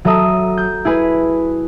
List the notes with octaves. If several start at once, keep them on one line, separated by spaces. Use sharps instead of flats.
F#3 A4 E5 A#5 D#6
G6
E4 G#4 B4